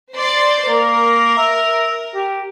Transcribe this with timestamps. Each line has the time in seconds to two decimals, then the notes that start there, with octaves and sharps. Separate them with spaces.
0.14 C5 D5 C6
0.69 A#3 A#4
1.38 E5
2.15 G4